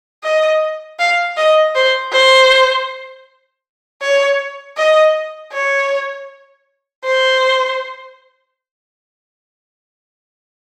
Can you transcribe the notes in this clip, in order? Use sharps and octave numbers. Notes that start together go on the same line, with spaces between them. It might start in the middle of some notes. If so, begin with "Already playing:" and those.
D#5
F5
D#5
C5
C5
C#5
D#5
C#5
C5